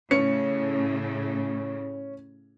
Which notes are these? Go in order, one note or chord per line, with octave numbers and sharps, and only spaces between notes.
A2 C#3 C#4 C#7